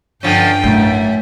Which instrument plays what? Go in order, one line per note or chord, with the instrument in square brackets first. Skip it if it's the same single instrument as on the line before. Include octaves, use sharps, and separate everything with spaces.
[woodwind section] G2 [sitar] D3 F3 C#4 [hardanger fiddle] G5
[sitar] F#2 [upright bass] A2 A3